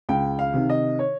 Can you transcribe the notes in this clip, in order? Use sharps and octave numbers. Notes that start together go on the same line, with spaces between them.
C#2 G5
F5
C3 D#3
D#5
C#5